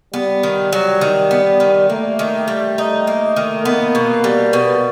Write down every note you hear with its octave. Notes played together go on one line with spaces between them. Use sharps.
G3 B3
D#3
F#3
D#3
B3
D#3
A3 A#3
D#3
G3
D#4
A#3
D#3
A#3 B3
B2
G3
B2 B3